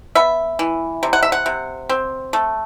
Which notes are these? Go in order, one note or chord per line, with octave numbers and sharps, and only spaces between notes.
B3 E5
E3
C3
F#5
E5
F#5
C3
C4
A3